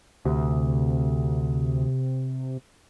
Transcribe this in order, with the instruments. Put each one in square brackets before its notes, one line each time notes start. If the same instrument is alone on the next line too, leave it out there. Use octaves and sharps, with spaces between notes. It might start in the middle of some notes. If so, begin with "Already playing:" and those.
[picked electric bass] D2 [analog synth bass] C3